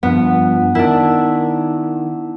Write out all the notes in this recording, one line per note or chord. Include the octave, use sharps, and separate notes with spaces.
G2 F3 B3
D#3 D4 E4